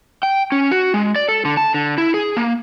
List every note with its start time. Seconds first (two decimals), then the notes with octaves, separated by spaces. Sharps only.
0.23 G5
0.52 C#4
0.71 F#4
0.94 G#3
1.16 D5
1.29 A4
1.45 D3
1.57 A5
1.74 D3
1.98 E4
2.14 G#4
2.37 A#3